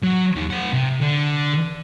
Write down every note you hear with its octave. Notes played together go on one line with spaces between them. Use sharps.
F#3
D#2 D#3
C4 F#5
C3
D3